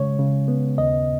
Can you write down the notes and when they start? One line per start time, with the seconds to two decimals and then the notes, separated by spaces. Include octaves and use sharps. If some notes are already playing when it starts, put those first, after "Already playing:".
Already playing: C#3 G#3 C#5
0.19 C#3
0.48 B3
0.78 D#2 D#5